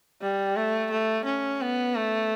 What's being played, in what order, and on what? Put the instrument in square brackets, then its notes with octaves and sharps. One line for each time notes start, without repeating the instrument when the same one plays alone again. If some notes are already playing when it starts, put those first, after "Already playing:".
[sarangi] G3
A3
A3
C#4
B3
A3